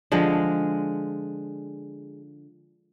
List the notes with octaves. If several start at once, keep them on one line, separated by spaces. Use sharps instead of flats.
D3 F3 G#3